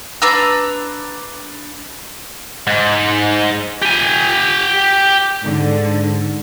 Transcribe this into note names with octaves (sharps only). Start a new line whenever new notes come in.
D4 B4 A#5 E6
G#2
G4 G#5
G#2 D3